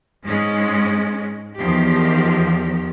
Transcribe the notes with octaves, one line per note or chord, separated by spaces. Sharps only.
G#2 G#3 C#4
E2 D#3 F3 G4